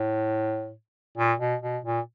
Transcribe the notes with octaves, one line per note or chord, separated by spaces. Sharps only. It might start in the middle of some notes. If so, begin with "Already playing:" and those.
Already playing: A2
A#2
B2
B2
A#2